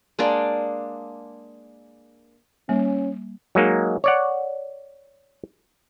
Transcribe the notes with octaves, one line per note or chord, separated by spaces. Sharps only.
G#3 A#3 D4 D5
G3 A#3 C#4
F#3 G#3 A#3 D#4
C#5 D5 F#5